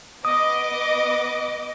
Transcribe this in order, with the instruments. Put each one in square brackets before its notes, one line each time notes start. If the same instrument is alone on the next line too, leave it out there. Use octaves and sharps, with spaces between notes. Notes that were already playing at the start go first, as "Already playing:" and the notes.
[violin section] B3 D#5 D6 [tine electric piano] D#6